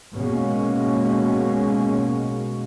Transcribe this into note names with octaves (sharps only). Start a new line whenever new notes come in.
B2 G#3 A#3 C#4